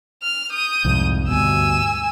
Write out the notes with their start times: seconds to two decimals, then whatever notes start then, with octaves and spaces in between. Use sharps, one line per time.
0.23 F6
0.52 D#6 G6
0.85 C2 F2 G#2
1.28 D2 G2 B2 G#5 E6